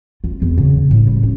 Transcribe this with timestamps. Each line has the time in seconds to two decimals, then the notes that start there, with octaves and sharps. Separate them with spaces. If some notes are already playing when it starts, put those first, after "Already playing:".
0.24 F4
0.42 E2
0.58 C#3
0.75 A#3
0.91 A2
1.07 G3
1.23 C#4